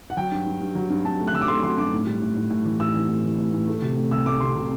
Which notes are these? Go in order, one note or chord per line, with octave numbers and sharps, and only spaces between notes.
F#5
F#3 G5
G2
G2
G2
F#3
G2
G2 A5
A3
F#6
F#3 E6
D6
A3 C6
F#3 C6
G2 D6
A2
G3
A2
A2
A2
E3
A2 E6
E3
A2
E3
A2
A2
A3
C3
A3
C2 E6
A3 D6
C3 C6
C3